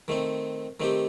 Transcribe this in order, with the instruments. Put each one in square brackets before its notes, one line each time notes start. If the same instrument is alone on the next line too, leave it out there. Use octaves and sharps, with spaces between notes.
[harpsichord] D#3 A3 C4
D#3 A3 C4 G4